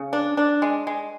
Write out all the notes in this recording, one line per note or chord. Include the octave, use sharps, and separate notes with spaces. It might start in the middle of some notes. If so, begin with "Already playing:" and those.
Already playing: C#3
D4
D4
G#3
G#3